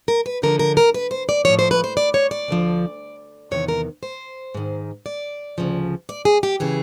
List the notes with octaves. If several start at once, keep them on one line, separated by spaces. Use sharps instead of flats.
A#4
B4
F#2 D3 F3 A#4
A#4
A#4
B4
C5
D5
A2 F3 C#5
C5
B4
C5
D5
C#5
D5
D2 D3 F3
E2 C3 D#3 C#5
A#4
C5
G#2 D#3
D5
D2 C#3 F3
D5
G#4
G4
C#3 E3 G#4